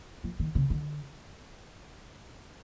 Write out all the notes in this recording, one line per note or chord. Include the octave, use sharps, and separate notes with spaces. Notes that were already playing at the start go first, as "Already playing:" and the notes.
F3
D#3
C#3
D3